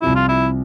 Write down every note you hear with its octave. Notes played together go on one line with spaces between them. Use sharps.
C2 C3 F3 E4
F4
E4